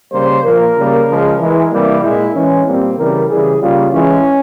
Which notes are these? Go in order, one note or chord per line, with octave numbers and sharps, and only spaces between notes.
C#3 G3 A#3 C5
A#2 F3 A#3 A#4
C#3 G3 A#3
C#3 F3 G#3
E3 G#3
C3 E3 G3 A#3 G4
A#2 G#3 E4
E3 G#3 C#4
A#2 G3 A#3 C4
C#3 E3 G3 A#4
C#3 E3 G3 G#4
C#3 G3 A#3 F4
E3 G#3 C#4